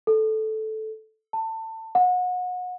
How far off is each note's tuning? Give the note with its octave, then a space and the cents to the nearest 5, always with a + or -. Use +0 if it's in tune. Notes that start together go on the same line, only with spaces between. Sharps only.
A4 -10
A5 +25
F#5 -30